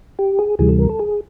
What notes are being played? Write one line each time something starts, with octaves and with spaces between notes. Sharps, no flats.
G4
G#4
D2 C3 E3 G3 G#4
A4
A#4
A4
G#4